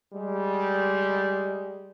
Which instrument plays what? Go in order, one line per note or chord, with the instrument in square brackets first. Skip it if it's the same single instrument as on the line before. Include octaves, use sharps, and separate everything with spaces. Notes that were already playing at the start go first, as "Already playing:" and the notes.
[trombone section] G3 G#3